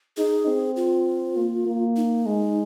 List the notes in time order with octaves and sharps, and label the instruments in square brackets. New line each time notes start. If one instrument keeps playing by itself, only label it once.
[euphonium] D#4 [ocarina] G#4
[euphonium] C4
[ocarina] F4
[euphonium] A#3
A#3
[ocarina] D#4
[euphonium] G#3